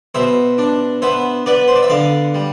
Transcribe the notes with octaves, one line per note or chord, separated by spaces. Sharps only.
B2 C5 E5
D4
B3 C5 E5
B3 B4 D5
C5
D5
E5
D3 D5 F5
G3